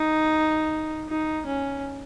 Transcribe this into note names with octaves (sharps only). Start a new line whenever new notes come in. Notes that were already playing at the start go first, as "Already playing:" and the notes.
Already playing: D#4
D#4
C#4